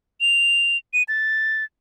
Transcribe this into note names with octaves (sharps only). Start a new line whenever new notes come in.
F7
D#7
A6